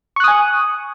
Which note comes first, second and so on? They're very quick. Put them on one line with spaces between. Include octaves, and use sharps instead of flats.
C#6 F#6 D#6 G#5